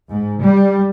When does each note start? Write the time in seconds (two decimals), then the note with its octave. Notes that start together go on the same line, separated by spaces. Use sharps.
0.11 G#2
0.42 G3